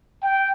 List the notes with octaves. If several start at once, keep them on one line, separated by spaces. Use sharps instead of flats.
G5